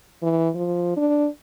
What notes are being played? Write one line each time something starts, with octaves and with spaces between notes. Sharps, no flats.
E3
F3
D4